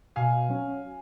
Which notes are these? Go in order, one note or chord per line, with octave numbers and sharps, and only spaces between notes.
B2 F5 G#5
F#3 C#4